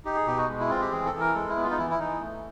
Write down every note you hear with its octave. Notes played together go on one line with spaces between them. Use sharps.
D#4 G4
G#4
B2 G4
F#4
G#3
E4
C4 F4
G4
E3 G#4
A4
E3
A#4
G#3 A4
E4
B3
F4
D#4
E3 E4
E4
E3 D#4
A3